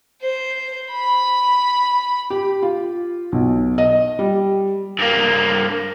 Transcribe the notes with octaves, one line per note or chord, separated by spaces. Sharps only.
C5
B5
G4
F4
B1
D#5
G3
G2 A#3